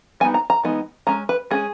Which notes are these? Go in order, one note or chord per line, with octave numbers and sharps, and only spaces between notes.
G3 B3 D#4 G#5
A#5
A#5
E3 G#3 B3 D#4
G#3 C#4 A#5
B4
G#3 C#4 G#4